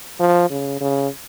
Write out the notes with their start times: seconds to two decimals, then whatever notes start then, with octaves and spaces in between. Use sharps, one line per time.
0.20 F3
0.50 C#3
0.81 C#3